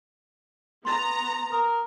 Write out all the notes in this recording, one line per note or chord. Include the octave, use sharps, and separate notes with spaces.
B3 A#5 C6 A6
A#4 D#6